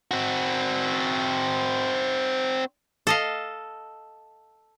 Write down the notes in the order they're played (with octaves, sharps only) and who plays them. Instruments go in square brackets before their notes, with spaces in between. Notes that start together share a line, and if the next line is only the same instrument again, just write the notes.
[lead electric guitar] C4 F#4
[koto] A4 D#5 F5